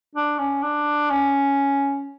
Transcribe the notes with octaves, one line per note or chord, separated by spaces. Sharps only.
D4
C#4
D4
C#4